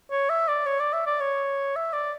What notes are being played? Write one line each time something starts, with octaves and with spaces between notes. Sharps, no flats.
C#5
E5
D5
C#5
D5
E5
D5
C#5
E5
D5